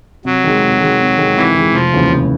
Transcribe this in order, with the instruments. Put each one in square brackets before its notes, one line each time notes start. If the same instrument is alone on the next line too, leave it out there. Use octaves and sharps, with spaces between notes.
[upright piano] C3 [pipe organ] F#3
[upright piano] D#3 G#3
C3
D#3 G#3
C3
D#3 G#3
[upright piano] C3 [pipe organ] E3
[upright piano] D#3 G#3
[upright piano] F1 [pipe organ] F3
[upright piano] D#2 C#3 E3 G#3
F1